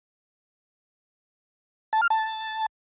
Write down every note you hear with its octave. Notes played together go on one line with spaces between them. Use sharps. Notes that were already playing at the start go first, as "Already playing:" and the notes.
A5
F6
A5